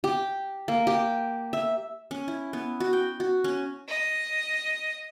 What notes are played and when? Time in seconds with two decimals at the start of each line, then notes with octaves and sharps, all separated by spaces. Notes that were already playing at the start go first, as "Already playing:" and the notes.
0.04 G4
0.68 A#3
0.87 G4
1.53 E5
2.11 C#4
2.28 E4
2.53 B3
2.80 F#4
2.93 G5
3.20 F#4
3.44 C#4
3.88 D#5